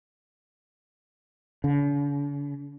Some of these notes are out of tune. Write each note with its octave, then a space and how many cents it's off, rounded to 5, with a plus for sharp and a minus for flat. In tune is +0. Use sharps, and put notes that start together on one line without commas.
D3 -45